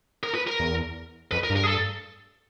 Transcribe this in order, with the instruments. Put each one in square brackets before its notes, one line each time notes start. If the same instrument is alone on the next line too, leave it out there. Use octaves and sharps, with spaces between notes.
[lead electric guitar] A#4
B4
A#4
[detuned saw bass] E2
[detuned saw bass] F2 [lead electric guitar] B4
[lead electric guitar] A#4
[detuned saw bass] G2
[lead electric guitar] A#4
G#4
A4